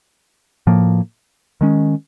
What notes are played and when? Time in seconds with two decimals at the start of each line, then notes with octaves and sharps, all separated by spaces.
0.67 A2 F3 A#3
1.61 D#3 G#3 C#4